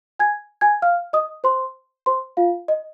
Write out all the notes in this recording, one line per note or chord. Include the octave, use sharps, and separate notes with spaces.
G#5 G#6
G#5 G#6
F5 F6
D#5 D#6
C5 C6
C5 C6
F4 F5
D#5